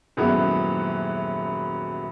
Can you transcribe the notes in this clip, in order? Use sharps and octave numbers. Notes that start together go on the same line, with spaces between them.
D#1 F#2 G#3 B3 E4